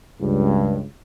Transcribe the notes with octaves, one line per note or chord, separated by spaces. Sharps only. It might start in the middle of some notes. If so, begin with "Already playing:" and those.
C#2 G2